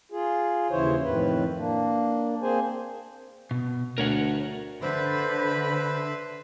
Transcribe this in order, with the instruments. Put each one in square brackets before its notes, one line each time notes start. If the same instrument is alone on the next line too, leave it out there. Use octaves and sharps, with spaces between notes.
[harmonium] F4 G#4
D#2 C#3 E3 E4 C5 C#5
F2 A2 D#3 E3 B4
A#3 D4
A#3 C4 G#4 C5 G#5
[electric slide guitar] B2
[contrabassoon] D2 [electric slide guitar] A#4 C#5 F#5
[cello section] D3 [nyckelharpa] B4 [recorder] C5 [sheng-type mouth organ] E5 B5 C6